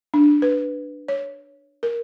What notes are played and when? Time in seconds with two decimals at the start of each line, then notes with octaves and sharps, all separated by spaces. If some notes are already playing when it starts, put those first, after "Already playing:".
0.14 D4
0.42 B4
1.08 C#5
1.83 A#4